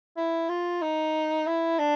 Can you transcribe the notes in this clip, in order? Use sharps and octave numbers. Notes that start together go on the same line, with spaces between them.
E4
F4
D#4
E4
D4